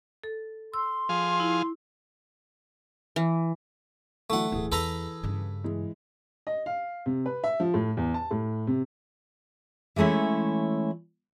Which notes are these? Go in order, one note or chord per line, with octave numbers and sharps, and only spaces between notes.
A4
C6 E6
F3 G#4 F5
E4
E3
D3 E3 F#3 A3 F#5
D1 E3 G#4
E2 A4 B4 A#5
G2 C#3
E3 G#3
D#5
F5
C3
B4
E5
F3
A2
E2
A5
A2
C3
E3 G#3 A3 C#4 E4